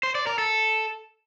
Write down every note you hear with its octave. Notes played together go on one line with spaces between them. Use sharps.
C5
D5
A#4
A4